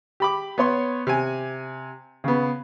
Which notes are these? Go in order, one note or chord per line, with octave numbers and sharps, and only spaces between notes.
G4 B5 D6
B3 C#5 C6
C3 G#5
C#3 B3